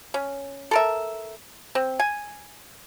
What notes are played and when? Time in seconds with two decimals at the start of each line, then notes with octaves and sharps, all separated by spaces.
0.14 C#4
0.71 A4 A#4 E5
1.75 C4
2.00 G#5